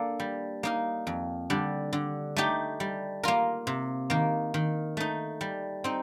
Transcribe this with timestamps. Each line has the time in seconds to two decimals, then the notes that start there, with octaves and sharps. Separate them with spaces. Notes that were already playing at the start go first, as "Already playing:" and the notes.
Already playing: A#3 D4 A4
0.20 G3
0.63 A#3 D#4 A#4
1.07 F2
1.50 D3 G3 D4
1.93 D3
2.37 A3 D#4 G4
2.80 G3
3.23 A#3 F4 A#4
3.67 C3
4.10 D#3 A#3
4.54 D#3
4.97 A3 D#4
5.41 G3
5.84 C4 D#4